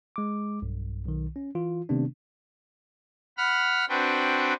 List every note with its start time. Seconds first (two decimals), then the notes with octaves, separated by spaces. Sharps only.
0.16 G#3 D6
0.62 B1 G2
1.06 B1 D#3
1.36 C#4
1.55 E3 F4
1.89 C3 D#3 A3 B3 C4 D4
3.38 F#5 B5 F6
3.89 C4 D4 F#4 B4 G5